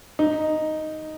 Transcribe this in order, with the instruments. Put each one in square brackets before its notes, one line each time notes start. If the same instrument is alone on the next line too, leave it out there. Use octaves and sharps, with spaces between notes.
[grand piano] D#4